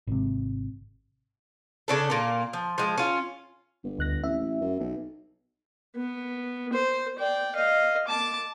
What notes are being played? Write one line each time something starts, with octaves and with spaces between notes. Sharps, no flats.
G#1 C3
C#3 D4 A4
A#2 A#3
F3
F3 G#3
C#4 F4
G1
D2 F#6 A#6
A1 E5
A1
F#2
B1
B3
C5
D5 G5
D#5 F5
A5 D6